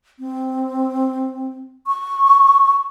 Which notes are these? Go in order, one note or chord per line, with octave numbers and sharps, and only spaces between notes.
C4
C#6